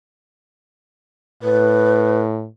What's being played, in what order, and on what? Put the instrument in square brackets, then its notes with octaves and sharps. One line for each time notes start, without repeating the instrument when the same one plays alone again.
[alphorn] A2 [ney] B4